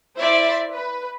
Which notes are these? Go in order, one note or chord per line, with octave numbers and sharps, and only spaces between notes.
E4 C5 D5 E5
B4